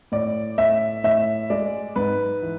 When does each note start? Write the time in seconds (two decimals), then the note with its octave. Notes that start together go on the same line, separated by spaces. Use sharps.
0.12 A2 D5
0.58 A2 E5
1.04 A2 E5
1.50 G#3 D5
1.96 G#2 B4
2.42 E3